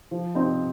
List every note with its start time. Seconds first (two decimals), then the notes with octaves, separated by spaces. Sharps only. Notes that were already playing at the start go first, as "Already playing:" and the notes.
0.11 F3
0.35 C4 D#4